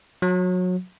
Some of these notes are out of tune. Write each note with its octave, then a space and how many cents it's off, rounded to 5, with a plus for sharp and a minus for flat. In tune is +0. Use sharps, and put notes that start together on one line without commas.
F#3 -25